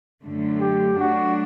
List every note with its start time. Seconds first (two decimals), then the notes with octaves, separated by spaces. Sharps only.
0.22 F#2 D3 A3
0.60 G4
0.99 F#3 A3 D4 F#4